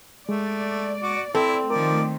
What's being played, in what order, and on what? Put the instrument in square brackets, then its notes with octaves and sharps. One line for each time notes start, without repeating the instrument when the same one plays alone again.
[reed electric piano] G#3 [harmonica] A3 [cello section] D5
[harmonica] F#4 D6
[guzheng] C4 [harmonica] E4 [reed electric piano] A4
[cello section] D#3 A3 [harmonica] F3 D5 [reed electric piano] A#4